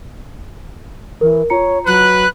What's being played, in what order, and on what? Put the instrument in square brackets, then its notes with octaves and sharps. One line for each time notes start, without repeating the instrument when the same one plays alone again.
[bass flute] E3 [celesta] A#4
[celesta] F4 A#5 C#7 [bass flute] C#5
[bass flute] F#3 [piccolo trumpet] B4 [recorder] F#6